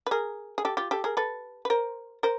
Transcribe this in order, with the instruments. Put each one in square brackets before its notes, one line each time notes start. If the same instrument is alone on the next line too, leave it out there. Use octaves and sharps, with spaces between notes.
[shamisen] B4
G#4 A#4
G#4
G4 A4
F4 G4
G4 A4
G#4 A#4
A4 B4
B4
A#4 C5
A#4 C5